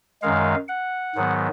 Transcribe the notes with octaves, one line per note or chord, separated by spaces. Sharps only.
F#2 D#3 G#3 F5
F#5
G#2 D#3 F#3 B3